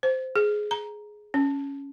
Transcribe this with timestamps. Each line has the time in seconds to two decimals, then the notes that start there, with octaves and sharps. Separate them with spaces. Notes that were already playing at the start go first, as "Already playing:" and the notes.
0.03 C5
0.36 G#4
0.71 A#5
1.34 C#4